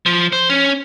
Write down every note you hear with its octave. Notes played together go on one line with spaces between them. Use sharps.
F3
C5
C#4